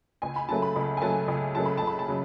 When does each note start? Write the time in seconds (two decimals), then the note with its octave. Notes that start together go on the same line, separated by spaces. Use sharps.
0.22 C#2 G#5
0.36 B5
0.49 C#3 F#3 A3 A5
0.62 B5
0.76 C#2 B5
0.97 G#5
1.02 C#3 F#3 A3 A5
1.28 C#2 G#5
1.55 C#3 F#3 A3 A5
1.66 B5
1.78 C#2 A5
1.87 B5
1.99 A5
2.08 C#3 F#3